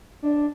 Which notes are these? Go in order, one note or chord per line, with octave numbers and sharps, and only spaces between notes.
D4